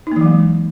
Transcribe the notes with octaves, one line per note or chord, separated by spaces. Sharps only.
E3 F#3 G#3 A#3 D#4